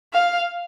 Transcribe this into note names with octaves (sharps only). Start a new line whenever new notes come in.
F5